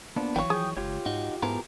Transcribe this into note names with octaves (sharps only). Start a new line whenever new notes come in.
F3 A#3 B3 D4
G#1 E3 F#3 C#5 F5 G5
F3 G#4 G5 D#6
F#1 C#2 F4 G4 C#5
G#2 D#4 F#4
G#2 E3 F3 B3 G#4 A#4